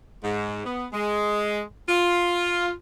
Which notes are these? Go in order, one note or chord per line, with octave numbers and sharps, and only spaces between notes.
G#2
B3
G#3
F4